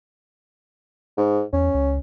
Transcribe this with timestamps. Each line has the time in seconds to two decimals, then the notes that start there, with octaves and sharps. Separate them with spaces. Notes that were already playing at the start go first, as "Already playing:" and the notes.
1.17 G#2
1.53 E2 C#4
1.74 C#2